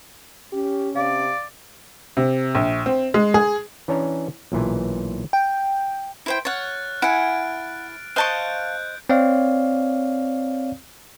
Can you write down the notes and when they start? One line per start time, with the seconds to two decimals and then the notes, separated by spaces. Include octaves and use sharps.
0.53 C#4 G4
0.96 C3 D5 F5
2.17 C3
2.55 A#1
2.86 C4
3.14 G#3
3.34 G#4
3.88 E3 C#4 D4 C#5 A#5
4.52 B1 A#2 E3 G#5
5.33 G5
6.26 E4 C5 G5
6.45 C#5 F#5 F6 F#6 A6
7.02 E4 F#5 G#5 D7
8.16 C5 D#5 F5 A5 C#6 F#6 G6 D7
9.09 C4 C#5 D5 F5